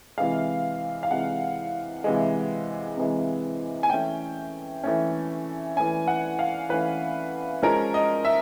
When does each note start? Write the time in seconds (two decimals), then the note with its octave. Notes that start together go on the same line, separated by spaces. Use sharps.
0.17 C3 E3 G#3 F5
1.03 F5
1.10 C3 E3 G#3 F#5
2.04 C3 E3 G#3
2.97 C3 E3 G#3
3.83 G#5
3.90 E3 A3 C#4 G5
4.83 E3 A3 C#4
5.76 E3 A3 C#4 G#5
6.08 F#5
6.39 F5
6.69 E3 A3 C#4 B4
7.63 F3 G#3 C#4 A#4
7.94 D#5
8.25 E5